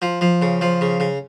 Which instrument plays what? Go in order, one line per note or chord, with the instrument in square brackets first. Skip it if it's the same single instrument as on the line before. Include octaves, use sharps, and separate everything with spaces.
[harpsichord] F3
F3
C#3
F3
C#3
C#3